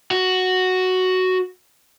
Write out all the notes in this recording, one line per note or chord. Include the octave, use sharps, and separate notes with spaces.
F#4